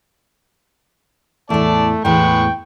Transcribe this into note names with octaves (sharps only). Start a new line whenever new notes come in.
E2 A2 A3 D5 A5
E2 A2 G#3 B4 G5 C#6